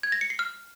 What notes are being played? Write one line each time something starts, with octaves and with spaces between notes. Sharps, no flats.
G#6
A#6
C#7
C7
F6